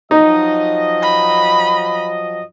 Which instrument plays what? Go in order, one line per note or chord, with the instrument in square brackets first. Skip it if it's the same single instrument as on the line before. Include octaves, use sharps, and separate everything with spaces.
[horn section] F3 F#3 D#5 [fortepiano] D#4
[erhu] B5